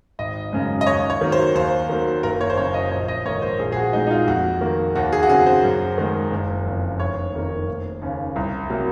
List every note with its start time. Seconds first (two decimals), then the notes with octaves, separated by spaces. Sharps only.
0.19 G#1 D#5
0.53 F#2 C#3 G#3
0.81 D#5
0.87 D#2 C#5
1.10 C#5
1.21 D#3 F#3 A#3
1.32 C5
1.55 D#2 C5
1.89 D#3 F#3 A#3
2.23 F#1 A#4
2.41 C#5
2.50 C5
2.57 F#2 C#3 C#5
2.74 D#5
2.91 A#1 C#5
3.08 D#5
3.25 G#2 D#3 A#3 C#5
3.42 C5
3.59 A#1 G#4
3.72 G#4
3.76 F#4
3.93 A#2 G#3 C4 D#4
4.07 D#4
4.11 F4
4.27 F2 F#4
4.61 D#3 A#3
4.95 D#2 F#4
5.12 G#4
5.23 F#4
5.29 C#3 F#3 C4 G#4
5.46 C5
5.64 F#2
5.98 D#3 G#3
6.31 F#1
6.66 F2 C#3
7.00 F1 C#5
7.33 F2 D#3 A#3
7.68 F1
8.02 D#2 C#3
8.36 C2
8.70 C3 F#3 A#3